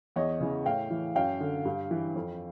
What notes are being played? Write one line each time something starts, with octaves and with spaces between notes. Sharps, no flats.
E2 C#5 D#5
C#3 E3
A2 F5 G5
E3
F#2 F5 G5
D3
G2
E3
F2